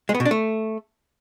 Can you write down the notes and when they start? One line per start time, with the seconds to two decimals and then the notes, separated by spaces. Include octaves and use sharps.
0.09 G#3
0.15 B3
0.20 B2
0.25 D4
0.31 A3